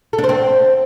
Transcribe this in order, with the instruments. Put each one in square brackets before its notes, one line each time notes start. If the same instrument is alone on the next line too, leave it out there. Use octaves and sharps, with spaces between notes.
[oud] A4
D4
C5
C4